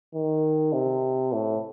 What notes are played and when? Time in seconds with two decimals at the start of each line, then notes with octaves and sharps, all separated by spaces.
0.14 D#3
0.73 C3
1.33 A2